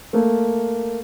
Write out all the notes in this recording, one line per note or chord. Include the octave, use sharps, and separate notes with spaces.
A3 A#3